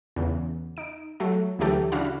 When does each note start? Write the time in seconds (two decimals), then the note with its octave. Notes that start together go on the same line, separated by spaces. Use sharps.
0.16 E2 C#3
0.77 D#4 D7
1.20 F#3 A3
1.59 D2 E3 F#3 A3 G4 A4
1.92 C#3 D4 E4 F#4 F5 B5